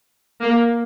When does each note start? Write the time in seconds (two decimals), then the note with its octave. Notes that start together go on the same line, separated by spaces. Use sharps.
0.42 A#3